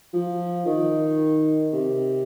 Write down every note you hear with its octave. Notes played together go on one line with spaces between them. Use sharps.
F3
D#3
C3